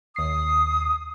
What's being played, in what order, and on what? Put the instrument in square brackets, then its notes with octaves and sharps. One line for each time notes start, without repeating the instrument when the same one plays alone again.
[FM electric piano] D#2 C7 [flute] D#6